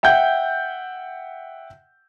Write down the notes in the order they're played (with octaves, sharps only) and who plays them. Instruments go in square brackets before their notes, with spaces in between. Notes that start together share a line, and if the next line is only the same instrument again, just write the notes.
[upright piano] E5 F#5 G5 G6